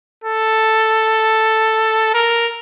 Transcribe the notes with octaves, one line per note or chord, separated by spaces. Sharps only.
A4
A#4